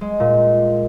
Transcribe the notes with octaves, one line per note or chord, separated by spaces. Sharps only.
G#3
A#2